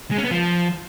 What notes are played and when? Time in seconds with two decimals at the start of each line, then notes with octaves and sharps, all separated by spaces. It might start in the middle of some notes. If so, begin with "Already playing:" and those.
0.11 G#3
0.18 C#4
0.24 B3
0.31 F3